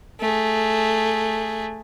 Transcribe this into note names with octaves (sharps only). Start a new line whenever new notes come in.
A3 G#4